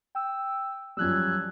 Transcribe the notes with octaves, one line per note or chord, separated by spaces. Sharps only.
G5 E6
F#2 F3 G3 E6 F#6 G#6